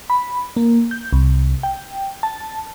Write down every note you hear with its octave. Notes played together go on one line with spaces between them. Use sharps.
B5
A#3
G6
C2
G5
A5